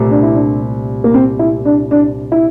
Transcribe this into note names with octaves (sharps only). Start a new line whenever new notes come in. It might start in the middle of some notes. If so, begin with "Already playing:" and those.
Already playing: C2 A#2 A3
D4
E4
D4
A#3
C4
E4
D4
D4
E4